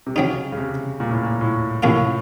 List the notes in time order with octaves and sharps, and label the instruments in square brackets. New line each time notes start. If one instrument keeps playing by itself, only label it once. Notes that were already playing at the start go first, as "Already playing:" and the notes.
[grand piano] C3
[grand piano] C#3 [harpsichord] F#3 C4 D#4
[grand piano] C#3
C3
A#2
A2
A#2
A2
[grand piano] A2 [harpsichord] C3 F3 A#3 F4